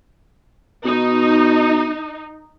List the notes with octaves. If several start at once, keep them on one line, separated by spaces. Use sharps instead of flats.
B2 D#4